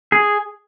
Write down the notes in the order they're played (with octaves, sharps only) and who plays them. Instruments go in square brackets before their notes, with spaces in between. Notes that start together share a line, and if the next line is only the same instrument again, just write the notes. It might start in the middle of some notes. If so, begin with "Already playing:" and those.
[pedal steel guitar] G#4